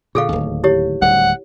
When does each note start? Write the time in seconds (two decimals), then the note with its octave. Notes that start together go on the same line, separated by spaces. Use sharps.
0.15 A#2 D3 G#4 A4 F5
0.29 D1 D#2
0.64 E4 G4 C#5
1.02 D1 D#2 G3 F#5